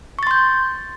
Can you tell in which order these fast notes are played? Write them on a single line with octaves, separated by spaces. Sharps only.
C#6 A6 C6 G6